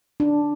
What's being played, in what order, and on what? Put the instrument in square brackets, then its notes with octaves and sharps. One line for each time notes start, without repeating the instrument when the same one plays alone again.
[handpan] D4